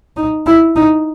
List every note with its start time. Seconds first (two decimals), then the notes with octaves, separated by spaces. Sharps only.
0.17 D#4
0.46 E4
0.76 D#4